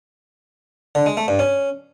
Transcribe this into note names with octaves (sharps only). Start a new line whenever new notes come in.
D3
G#3
A3
G2
C#4